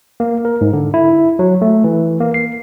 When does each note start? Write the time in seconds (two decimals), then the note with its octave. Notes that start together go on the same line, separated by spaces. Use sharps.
0.20 A#3
0.45 A#4
0.61 G#2
0.73 D3
0.94 E4
1.39 F#3
1.62 A3
1.84 E3
2.21 A#3
2.34 C7